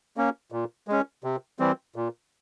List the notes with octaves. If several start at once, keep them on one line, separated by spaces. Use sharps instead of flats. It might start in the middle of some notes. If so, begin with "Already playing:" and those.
A#3 C#4
A#2
G#3 C#4
C3
E3 G3 C4
A#2